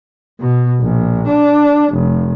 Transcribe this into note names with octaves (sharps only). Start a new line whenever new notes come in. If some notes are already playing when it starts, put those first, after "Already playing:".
B2
A#1
D4
F1